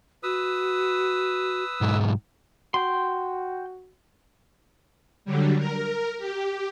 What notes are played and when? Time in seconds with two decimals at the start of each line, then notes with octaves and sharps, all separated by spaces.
0.23 F#4 B4 D#6 E6
1.81 B1 G#2
2.74 F#4 G5 C6
5.25 D3 F#3 G3
5.58 A#4
6.19 G4